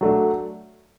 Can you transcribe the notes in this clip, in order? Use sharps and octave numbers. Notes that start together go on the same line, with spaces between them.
F#3 A3 D4